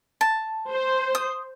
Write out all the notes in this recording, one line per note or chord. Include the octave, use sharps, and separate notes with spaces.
A5
C5
D#6